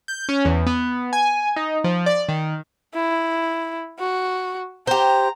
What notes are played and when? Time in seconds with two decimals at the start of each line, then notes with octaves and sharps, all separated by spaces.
0.08 G6
0.29 C#4
0.45 E2
0.66 B3
1.13 G#5
1.56 D#4
1.84 F3
2.06 D5
2.28 D#3
2.94 E4
4.00 F#4
4.87 G4 C5 A#5